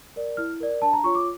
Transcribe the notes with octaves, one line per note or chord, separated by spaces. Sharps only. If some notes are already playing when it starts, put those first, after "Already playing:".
A#4 D5
E4 F6
A#4 D5
D4 A5
A#5
F4 C#5 C#6
D6